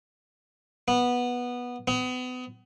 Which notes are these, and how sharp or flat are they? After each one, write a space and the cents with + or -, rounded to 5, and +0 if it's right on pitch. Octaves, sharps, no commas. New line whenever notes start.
B3 -10
B3 +35